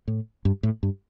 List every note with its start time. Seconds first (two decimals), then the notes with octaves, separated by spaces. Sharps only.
0.08 A2
0.45 G2
0.63 A2
0.83 G2